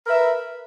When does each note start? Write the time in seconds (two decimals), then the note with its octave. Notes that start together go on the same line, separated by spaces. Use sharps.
0.04 A#4
0.07 B4
0.10 E5